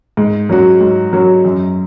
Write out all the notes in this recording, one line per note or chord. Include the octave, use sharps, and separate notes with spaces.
G#2
F#3 C#4 F#4
G#2
F#3 C#4 F#4
F#2